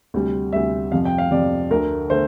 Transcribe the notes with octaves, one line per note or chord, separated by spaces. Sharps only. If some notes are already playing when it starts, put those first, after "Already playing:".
D2 C3 G3
D2 C3 G3 E5
F2 C3 F3 F5
G5
F5
F2 C3 F3 D5
D2 D3 A3 A#4
D3 A3 C5